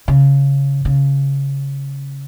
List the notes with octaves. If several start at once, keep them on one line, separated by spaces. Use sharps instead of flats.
C#3
C#3